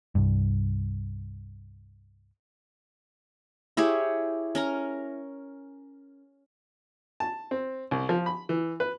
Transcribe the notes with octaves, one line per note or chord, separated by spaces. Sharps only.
C2 G2
E4 G4 G#4 C#5
C#4 A#4 A#5
A5
C4
C2
F3
B5
E3
B4